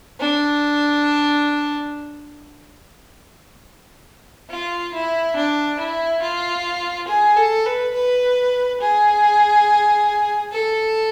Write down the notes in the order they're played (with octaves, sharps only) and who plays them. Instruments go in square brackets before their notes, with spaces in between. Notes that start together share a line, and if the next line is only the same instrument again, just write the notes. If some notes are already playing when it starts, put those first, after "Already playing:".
[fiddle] D4
F4
E4
D4
E4
F4
G#4
A4
B4
B4
G#4
A4